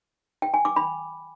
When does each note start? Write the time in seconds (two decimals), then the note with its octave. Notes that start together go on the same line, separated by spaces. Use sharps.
0.42 G5
0.54 G#5
0.65 D6
0.76 B5